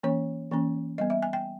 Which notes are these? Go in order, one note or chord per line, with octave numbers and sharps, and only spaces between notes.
E3 A#3 C#4 C#5
E3 A#3 C#4
G3 B3 D#5
E5
G#5
G5